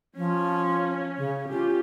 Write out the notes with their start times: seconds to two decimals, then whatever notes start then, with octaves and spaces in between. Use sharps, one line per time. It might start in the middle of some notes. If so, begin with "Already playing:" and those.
0.16 F3 C#4
1.18 C#3
1.49 C#4 F4 G4